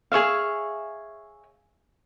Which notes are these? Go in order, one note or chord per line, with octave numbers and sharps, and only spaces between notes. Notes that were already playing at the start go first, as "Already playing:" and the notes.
G#4 C#5 E5 F5